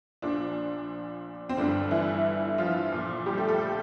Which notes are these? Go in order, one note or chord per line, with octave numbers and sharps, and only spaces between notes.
A#1 A#2 F3 D4
C4
G1 G2 D3 D4
E3 E4
F3 F4
A#1 A#2 F3
G3 G4
A3 A4
A3 A4